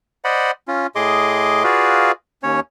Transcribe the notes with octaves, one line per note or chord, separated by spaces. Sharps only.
C5 D5 D#5 F#5 B5
C#4 F4
A2 G#4 D#5 C6 D6
F4 F#4 G#4 B4 D5 F5
D#2 C#4 C#5